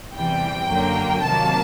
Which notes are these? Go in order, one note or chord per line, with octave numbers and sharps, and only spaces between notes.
E2 C3 E3 G3 G5
F#2 D3 F#3 A#3
C3 D#3 F#3 A#3 A5